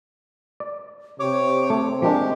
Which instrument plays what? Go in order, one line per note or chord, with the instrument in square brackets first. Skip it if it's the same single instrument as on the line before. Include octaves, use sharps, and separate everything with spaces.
[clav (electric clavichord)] D5
[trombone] C3 [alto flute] G4 [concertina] C#5 D6
[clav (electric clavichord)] A3 [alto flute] C4
[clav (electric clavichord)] F3 A#3 D4 [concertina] G#3 G4